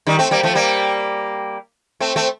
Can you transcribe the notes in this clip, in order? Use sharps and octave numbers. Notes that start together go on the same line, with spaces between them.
D#3 G3
A3 C4
G3 A#3
F3 A3
G3 A#3
A3 C4
A3 C4